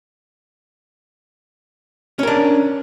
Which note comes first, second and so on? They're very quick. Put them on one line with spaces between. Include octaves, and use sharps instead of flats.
C#4 A#4 D4